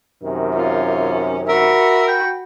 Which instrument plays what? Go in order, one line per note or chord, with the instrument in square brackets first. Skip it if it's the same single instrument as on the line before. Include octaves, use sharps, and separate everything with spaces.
[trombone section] F#2 C3 D#3
[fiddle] C#4 [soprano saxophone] F4
[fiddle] F#4 B5 [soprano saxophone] A#4 [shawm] E5
[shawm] G5